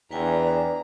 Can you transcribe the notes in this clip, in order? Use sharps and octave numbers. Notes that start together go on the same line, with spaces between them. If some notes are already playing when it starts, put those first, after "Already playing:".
E2 D4 B4 G5 G#5 A#5